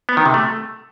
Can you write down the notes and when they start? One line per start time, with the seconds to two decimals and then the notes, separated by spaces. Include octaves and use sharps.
0.09 B3
0.17 D#3
0.26 C3
0.34 A3